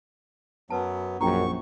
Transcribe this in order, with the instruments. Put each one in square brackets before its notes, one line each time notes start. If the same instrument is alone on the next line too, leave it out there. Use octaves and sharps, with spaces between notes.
[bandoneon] F#2 F#3 B3 [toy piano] B4 A5
[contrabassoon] A#1 [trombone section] F#2 [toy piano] G5 A#5 [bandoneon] C#6